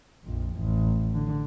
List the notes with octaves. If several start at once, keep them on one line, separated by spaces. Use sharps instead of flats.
A#1 F2
A1
D3